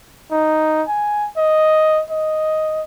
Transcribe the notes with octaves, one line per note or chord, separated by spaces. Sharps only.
D#4
G#5
D#5
D#5